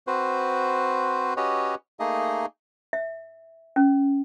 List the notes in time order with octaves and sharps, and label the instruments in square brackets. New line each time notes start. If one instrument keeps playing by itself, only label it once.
[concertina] C4 F#4 B4 C5
C#4 F#4 G4 B4 C#5 D#5
A3 A#3 D#4 G#4 D#5
[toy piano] E5
C#4